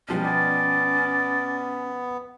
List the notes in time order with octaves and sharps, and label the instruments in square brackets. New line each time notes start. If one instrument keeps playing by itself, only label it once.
[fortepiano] B2 F3 G3 [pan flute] C#4
[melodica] B3 [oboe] D5